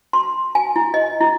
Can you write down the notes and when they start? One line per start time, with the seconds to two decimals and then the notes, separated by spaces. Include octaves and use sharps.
0.13 C6
0.55 G#5
0.76 E4
0.94 D#5
1.21 E4